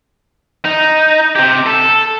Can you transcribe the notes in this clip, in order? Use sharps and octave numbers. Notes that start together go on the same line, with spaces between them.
D#4
C3 G4
A4